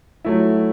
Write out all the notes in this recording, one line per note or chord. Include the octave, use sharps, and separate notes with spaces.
F#3 A3 E4